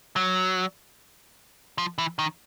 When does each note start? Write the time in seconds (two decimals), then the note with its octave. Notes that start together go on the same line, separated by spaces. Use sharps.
0.16 F#3
1.78 F3
1.98 E3
2.19 D#3